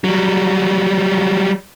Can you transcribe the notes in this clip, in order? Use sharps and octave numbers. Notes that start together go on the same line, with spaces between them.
F#3 G3